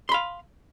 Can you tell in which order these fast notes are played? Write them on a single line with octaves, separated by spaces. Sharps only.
C6 B5 F5